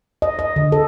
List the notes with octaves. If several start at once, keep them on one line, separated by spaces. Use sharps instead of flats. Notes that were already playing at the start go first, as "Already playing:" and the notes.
D#5
D#5
D3
A4